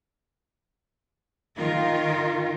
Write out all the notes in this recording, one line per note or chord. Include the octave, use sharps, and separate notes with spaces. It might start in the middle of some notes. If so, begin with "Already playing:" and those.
D#3 F4 A#4